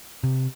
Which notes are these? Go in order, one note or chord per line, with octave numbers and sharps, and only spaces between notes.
C3